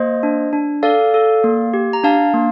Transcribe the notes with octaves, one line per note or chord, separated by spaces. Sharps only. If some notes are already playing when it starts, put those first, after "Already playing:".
Already playing: A#3 C5 D#5
D4
D4
A4 D5 F5
A4
A#3
G4
A#5
D4 F5 A5
A#3